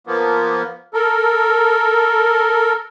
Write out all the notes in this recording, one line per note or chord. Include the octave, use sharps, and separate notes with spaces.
F3 A#3 B3
A4 A#4